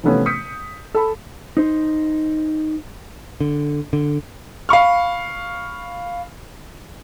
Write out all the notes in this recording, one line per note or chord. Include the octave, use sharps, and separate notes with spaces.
C3 E3 F3 A3 B3 C#4
D#6 G6 B6 C#7
A4 B5
D#4 C5
D3
D3
F5 B5 C#6 F6